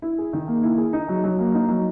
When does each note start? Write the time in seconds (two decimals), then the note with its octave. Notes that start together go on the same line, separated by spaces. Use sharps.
0.02 E4
0.18 G#4
0.33 D#3
0.48 A#3
0.63 E4
0.78 G#4
0.93 D#4
1.08 F#3
1.24 F#3
1.39 A#3
1.54 D#4
1.68 F#3